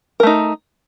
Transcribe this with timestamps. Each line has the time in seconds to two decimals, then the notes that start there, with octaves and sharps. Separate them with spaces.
0.20 A#4
0.23 A3
0.27 D#4